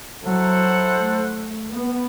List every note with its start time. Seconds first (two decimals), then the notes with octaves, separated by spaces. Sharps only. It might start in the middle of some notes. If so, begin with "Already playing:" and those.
0.23 F#3 E4 A4 C5 F#5
0.97 A3
1.71 B3